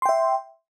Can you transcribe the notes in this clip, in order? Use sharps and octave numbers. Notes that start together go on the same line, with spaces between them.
E5 G5 C6